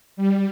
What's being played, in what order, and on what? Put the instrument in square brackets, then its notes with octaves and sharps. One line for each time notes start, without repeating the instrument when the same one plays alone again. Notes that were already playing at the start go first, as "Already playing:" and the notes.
[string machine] G3